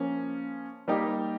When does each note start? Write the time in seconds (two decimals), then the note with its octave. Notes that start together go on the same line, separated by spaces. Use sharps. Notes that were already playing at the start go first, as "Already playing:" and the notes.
Already playing: F3 A#3 C#4
0.88 G3 A#3 D#4 G4